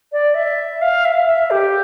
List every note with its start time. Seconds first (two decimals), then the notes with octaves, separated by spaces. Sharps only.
0.12 D5
0.34 E5
0.81 F5
1.05 E5
1.27 E5
1.50 G4